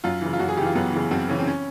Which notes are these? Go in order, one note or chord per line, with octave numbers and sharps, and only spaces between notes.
F#2 F4
C#3 E3
F4
F#2 F#4
G#4
C#3 E3 F4 G4
F#2 B3
C#3 E3
F#2 C4
C#3 E3 C#4
C4
C#4